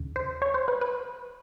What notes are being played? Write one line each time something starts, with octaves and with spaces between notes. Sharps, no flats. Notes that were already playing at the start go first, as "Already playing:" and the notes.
Already playing: D#2 C#3
C5
C#5
C5
B4
B4